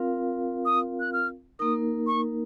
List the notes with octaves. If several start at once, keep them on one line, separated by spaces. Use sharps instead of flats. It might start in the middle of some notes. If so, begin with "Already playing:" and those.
Already playing: C4 F4 A#4 F5
D#6
F#6
F6
A#3 D#4 A#4 D#6
C#6